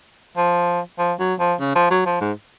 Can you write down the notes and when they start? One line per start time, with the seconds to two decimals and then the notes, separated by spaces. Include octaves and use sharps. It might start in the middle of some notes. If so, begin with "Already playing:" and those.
0.37 F3
0.99 F3
1.20 F#3
1.39 F3
1.60 C#3
1.75 F3
1.91 F#3
2.06 F3
2.21 G#2